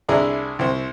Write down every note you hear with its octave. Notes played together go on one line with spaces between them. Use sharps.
C2 D4 E4 G#4 A#5
C2 C4